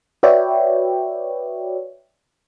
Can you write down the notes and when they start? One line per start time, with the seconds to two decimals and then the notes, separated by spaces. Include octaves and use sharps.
0.23 F#4 B4 C#5 D5 E5 G5